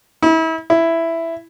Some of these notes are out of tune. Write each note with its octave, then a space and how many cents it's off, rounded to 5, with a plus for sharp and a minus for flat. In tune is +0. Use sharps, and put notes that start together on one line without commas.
E4 -35
E4 +5